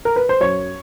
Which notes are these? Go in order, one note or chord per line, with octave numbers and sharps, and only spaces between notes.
A#4
B4
C5
F#2 C#5